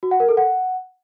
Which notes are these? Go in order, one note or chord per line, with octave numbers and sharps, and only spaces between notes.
F#4
F#5
A#4
A4
F#5